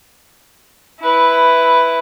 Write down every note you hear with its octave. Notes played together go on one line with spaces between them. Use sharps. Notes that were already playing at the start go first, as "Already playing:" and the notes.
E4 B4